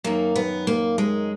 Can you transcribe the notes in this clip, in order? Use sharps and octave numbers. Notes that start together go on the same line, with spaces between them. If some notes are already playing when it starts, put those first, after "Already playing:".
F#2 D#3 A#3
B3
A#3
G#3